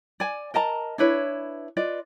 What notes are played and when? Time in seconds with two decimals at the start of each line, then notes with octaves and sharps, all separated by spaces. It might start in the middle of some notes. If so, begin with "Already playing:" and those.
0.20 D5 G#5
0.54 A#4 D#5 A5 A#5
0.98 D4 E4 B4 C#5
1.77 F4 B4 D5 D#5